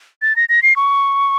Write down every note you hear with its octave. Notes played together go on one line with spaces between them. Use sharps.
A6
A#6
A#6
C7
C#6